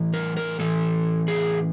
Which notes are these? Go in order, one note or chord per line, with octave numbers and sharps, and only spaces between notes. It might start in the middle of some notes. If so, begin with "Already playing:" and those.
Already playing: A2 E3
A#4
A#4
A2 E3 A4
G#4